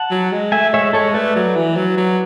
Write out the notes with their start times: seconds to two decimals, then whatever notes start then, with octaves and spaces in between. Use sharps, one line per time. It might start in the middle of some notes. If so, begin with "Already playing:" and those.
Already playing: F#5 A5
0.11 F#3
0.32 G#3
0.52 A3 E5 G#5
0.73 G#3 C#5 E5
0.93 G#3 A4 C#5
1.14 A3 B4 D5
1.36 F#3
1.56 E3
1.76 F#3
1.97 F#3